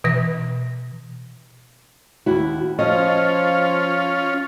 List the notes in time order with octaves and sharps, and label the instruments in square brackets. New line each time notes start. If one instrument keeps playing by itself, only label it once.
[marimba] B2 E3 B4 A#6
[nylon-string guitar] D#2 E4 F#4
[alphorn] F3 [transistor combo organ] C#4 F4 [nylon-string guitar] D#5